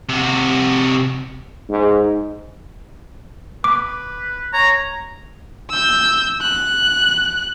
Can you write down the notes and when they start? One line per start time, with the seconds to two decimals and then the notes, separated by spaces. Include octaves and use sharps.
0.09 C3 F#4
1.69 G#2
3.64 B4 D6
4.53 C#5 A#5
5.70 E6 G6
6.42 F#6